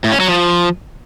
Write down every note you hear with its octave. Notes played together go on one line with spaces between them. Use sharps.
A2
C#4
F#3
F3